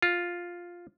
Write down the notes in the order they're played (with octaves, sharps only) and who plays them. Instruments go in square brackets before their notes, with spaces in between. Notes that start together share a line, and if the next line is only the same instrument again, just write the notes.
[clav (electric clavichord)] F4